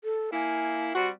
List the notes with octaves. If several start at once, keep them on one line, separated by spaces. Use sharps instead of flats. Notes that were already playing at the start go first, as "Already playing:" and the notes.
A4
A#3 E4 G#5
G3 C4 F#4